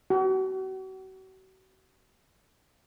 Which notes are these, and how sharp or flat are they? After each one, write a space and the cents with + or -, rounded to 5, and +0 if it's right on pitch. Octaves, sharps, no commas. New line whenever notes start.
F#4 +40